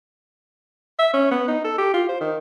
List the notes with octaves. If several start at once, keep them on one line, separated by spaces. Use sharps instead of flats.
E5
C#4
B3
D#4
A4
G4
F4
C5
D#3